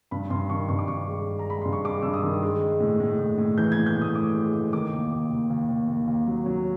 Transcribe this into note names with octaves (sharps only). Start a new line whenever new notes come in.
G2 B5
G2 C6
D#3 C#6
G2 C#6
D6
G2 C#6
G#3
G#3
A#5
G#3 B5
G2 C6
C#6
G#3 D6
G2 E6
D#6
D#3
G#3
G#3
A2
A2
A2
A2
E3 G6
A2 G#6
G6
A2
D#6
A2 D6
G#3
A2
D#3 D6
D#2
D#2
D#2
D#2
D#2
D#2
D#2
F#3
F#3